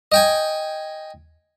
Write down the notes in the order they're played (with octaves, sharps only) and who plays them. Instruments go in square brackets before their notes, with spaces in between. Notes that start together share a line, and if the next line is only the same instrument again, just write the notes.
[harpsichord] D#5 G5 G#5